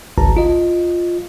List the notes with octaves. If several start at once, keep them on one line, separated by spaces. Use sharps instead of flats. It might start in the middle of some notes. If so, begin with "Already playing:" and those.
G#1 C#2 A5 A#5
F4 D#5